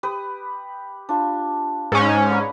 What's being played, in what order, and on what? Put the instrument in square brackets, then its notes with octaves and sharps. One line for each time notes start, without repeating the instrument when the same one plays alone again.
[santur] G4 B4 D#6
D4 F4
[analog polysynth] G#2 C#4
[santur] B4 D5 A#5